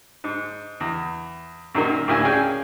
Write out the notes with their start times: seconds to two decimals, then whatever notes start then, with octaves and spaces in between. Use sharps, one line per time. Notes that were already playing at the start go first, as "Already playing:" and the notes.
0.24 G#2
0.80 E2
1.75 F#2 A#2 D#3 A#3
2.07 D2 A2 A#3 E4 F5 G#5
2.25 C#4 D4 G#4 F5 G5 G#5